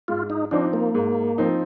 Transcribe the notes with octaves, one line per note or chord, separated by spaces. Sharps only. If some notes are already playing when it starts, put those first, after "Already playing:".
G#2 F4
D#4
F3 C4 D4 D#4
A#3
G#2
F3 C4 D#4